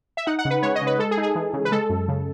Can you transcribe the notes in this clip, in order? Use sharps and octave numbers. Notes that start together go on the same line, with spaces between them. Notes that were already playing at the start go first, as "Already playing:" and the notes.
E5
D#4 F#5
F#5
C#3
B4
G#3 C#5
D#5
C#3
B4
G#3 A4
G#4
D#4
G#4
E3
C#3
B4
G#3 A4
F#2
C#3